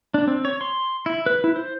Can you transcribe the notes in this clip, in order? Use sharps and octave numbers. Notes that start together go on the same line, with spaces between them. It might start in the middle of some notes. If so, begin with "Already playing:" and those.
D4
C4
C#5
C6
E4
B4
E4
C5